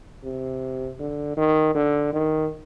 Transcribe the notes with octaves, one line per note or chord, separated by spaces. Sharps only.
C3
D3
D#3
D3
D#3